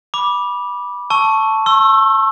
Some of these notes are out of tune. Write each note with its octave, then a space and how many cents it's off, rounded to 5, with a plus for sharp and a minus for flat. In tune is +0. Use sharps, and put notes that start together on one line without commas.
B5 -15 D6 +0
A5 +0 C#6 +0 E6 +5
C#6 -40 E6 +15